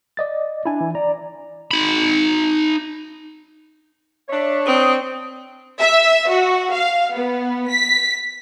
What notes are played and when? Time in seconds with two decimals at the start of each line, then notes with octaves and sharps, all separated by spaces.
0.17 D5 D#5 A6
0.65 D4 E4 G#5
0.81 E3
0.95 D5 A#5
1.71 D#4 B5
4.29 D4 C#5 E5
4.65 C4 D#6
5.81 E5
6.29 F#4
6.72 F5
7.15 B3
7.70 B6